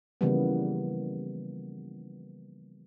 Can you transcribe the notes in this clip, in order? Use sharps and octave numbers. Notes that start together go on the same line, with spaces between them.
C#3 E3 F3 G3 A#3 B3